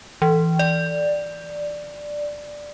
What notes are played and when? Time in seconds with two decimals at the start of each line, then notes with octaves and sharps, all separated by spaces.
0.22 E3
0.59 D5